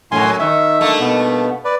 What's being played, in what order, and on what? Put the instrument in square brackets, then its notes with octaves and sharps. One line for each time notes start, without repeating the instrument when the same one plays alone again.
[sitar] F#2 F#3 [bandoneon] A2 G#5 C6
[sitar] D#3 [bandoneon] E5
[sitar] G2 A3 A#3
[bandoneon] B2 B3
B4 D5